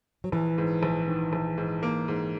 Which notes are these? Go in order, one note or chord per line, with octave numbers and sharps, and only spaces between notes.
F#3
A#1 E3
G#2
A#1
D#3
A#1
G#2
A#3
G#2